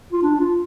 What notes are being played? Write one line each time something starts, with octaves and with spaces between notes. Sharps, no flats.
F4
D4
D4
F4